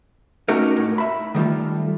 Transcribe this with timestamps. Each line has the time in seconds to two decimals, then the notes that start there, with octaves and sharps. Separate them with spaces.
0.48 A3 C#4 D#4 F#4 G4 A#4
0.77 A2
0.98 E5 B5
1.35 D#3 G3 A3 F4